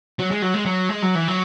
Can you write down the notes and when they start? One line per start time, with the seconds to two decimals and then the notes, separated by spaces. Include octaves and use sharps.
0.19 F#3
0.31 G#3
0.42 F#3
0.54 G#3
0.66 F#3
0.89 G#3
1.02 F#3
1.15 E3
1.28 F#3